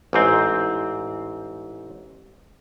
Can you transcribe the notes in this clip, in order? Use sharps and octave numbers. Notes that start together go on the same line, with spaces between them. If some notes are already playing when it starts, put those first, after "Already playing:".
A1 G#2 C4